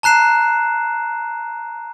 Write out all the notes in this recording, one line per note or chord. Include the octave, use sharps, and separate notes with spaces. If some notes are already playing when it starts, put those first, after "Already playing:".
A5 A#5 F#6 C7 E7